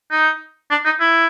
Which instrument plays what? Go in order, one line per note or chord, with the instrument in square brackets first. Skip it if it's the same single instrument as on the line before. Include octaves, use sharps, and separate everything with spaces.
[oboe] D#4
D4
D#4
E4